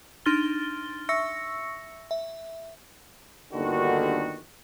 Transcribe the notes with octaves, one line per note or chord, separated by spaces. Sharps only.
D4 D#4 C6 F6 A6 G7
E5 C#6 E6 A#6 C#7
E5
G1 D#2 D3 D#3 F#4